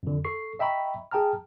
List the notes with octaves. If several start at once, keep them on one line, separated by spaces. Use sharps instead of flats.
F2 D3
A4 C#6 C7
D#5 E5 G5 A#5 B5 C#6
G#4 G5 A5 A#5 F6